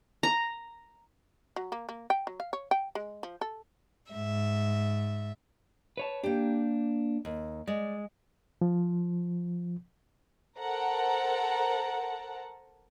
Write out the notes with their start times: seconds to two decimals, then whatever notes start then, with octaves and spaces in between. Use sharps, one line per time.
0.23 A#5
1.56 F#3
1.72 A#3
1.89 A#3
2.10 G5
2.27 F#3
2.40 F5
2.53 C#5
2.71 G5
2.95 G#3
3.23 F3
3.41 A4
4.11 G#2 E5
5.97 B4 C#5 A5
6.24 A#3 D4 G4 G5
7.25 D#2
7.67 G#3 D5
8.61 F3
10.58 A4 A#4 C5 F#5 A5 A#5